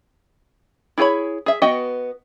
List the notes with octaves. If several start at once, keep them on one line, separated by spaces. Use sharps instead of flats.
E4 F4 G#4 C#5 B5
G#4 E5
B3 F#4 D#5 G5